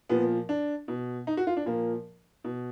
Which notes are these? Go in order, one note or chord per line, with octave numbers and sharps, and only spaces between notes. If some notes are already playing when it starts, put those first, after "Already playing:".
A#2 F3 B3
D4
B2
D#4
F#4
F4
D4
A#2 F3 A#3
B2